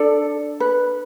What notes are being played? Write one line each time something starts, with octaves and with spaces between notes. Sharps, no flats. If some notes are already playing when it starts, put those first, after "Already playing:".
Already playing: D4 A4 D5
B4